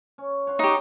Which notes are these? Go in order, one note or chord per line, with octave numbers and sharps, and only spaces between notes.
C#4
C#5 F#5 C6
D#4 F#4 G4